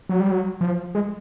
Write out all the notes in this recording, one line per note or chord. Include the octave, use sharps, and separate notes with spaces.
F#3
G3
F#3
F3
G#3